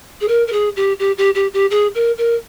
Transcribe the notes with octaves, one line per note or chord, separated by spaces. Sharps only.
G#4
A#4
A#4
G#4
G4
G4
G4
G4
G4
G#4
A#4
A#4